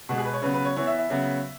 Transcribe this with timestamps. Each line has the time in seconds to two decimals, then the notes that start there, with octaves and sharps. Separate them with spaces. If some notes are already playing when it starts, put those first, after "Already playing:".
0.09 B2 G#3 B3 F#4
0.18 G#4
0.25 B4
0.33 C#5
0.42 C#3 F#3 B3 B4
0.54 B4
0.65 C#5
0.76 E3 B3 C#5
0.87 E5
0.98 E5
1.10 C#3 F#3 B3